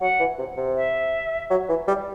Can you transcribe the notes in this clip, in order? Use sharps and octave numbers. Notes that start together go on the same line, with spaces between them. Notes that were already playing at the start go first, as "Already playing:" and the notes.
F#3 F#5
E3
C3
C3
E5
F#3
E3
G3